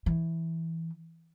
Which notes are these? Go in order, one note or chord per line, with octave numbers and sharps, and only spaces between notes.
E3